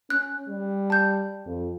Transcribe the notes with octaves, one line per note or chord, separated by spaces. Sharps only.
C#4 F#6
G3
A5 G6
F2